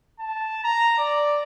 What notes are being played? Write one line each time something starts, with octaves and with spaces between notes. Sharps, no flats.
A5
A#5
D5